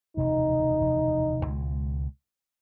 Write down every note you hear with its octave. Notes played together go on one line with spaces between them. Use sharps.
E1 D2 C3 F3 D#4
E1 D2 C3 F3
C#2 B2 G#3